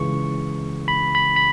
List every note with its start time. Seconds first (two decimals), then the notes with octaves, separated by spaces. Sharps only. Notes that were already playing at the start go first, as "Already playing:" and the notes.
Already playing: C#2 C#3 E3 C#6
0.88 B5
1.15 B5
1.36 B5